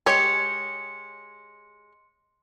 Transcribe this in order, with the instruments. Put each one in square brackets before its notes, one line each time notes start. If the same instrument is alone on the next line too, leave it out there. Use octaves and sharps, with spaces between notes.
[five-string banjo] G#3 G4 C#5 [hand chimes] C6 C#7